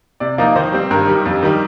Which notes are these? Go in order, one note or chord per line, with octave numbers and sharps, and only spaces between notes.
C3 D5
F3 A#3 D#4
D#3 C5
G3 C4
G2 A#4
D#3 G3
F2
D#3 G3